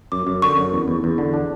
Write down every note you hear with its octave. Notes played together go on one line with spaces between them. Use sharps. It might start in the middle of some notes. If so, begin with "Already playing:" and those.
F#2 D6
F#2
D3 C#6
F#2
E2
E2
E2
D3
D4